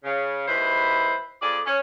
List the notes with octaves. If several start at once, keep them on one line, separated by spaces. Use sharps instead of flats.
C#3
D#2 G#3 E4 B4 C5
F2 G#4 D5
C#4